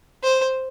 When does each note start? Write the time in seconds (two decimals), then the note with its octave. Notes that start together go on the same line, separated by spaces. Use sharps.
0.24 C5